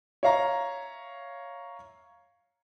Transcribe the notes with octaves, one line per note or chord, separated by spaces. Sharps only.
C#5 E5 F5 A#5